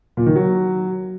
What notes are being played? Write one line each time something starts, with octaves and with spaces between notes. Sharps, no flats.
A#2
D#3
F#3